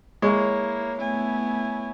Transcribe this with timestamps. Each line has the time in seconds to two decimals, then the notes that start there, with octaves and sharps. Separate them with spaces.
0.22 G#3 A#3 E4 C#5
0.98 A3 B3 E4 G#5